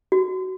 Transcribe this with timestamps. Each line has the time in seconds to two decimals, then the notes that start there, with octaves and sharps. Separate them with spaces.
0.12 F#4